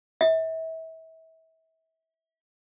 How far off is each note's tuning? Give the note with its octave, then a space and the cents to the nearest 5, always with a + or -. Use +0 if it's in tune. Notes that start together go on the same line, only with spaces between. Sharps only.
E5 -35